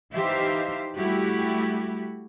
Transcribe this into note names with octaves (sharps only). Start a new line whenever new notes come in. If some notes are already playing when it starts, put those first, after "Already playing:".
E3 D#4 G4 C5 E5 F5
G3 A3 E4 F#4 G4